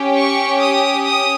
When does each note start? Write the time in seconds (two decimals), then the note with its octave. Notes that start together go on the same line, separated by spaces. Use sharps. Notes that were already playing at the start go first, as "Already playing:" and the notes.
Already playing: C#4 G4
0.17 C#6
0.61 D#6
1.06 D#6